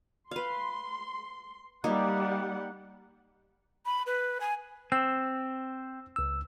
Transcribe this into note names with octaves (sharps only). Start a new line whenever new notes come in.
B4 F5 C6
G3 A#3 D#4 G4 F#5
B5
B4
G#5
C4 E6
C#2 E6